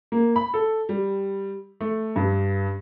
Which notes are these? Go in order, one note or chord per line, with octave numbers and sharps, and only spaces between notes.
A#3
B5
A4
G3
A3
G2